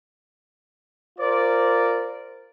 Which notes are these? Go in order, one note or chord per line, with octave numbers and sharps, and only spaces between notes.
F4 A#4 C5 D5